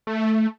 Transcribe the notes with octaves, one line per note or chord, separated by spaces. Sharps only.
A3